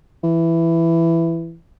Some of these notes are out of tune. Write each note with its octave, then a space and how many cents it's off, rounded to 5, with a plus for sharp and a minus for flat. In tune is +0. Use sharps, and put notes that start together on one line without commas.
E3 +10